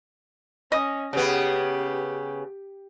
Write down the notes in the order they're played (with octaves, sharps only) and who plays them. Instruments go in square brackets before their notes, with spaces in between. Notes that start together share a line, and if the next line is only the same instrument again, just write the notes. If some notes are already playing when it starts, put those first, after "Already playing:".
[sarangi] C#4 [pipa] D#5
[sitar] C#3 B3 [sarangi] G4